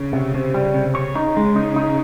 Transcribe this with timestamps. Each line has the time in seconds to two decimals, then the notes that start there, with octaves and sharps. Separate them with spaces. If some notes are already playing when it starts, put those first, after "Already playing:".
Already playing: C#3
0.13 C3
0.34 C3
0.54 G3
0.74 C3
0.95 C#3 C#5
1.15 D#4
1.37 G#3
1.56 D#4
1.76 D#4